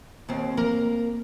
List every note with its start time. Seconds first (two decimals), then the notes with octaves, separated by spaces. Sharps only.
0.29 D#2 C4
0.57 A#3 A#4